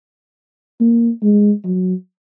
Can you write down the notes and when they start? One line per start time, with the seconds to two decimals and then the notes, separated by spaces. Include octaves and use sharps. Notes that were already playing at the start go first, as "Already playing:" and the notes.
0.81 A#3
1.22 G#3
1.65 F#3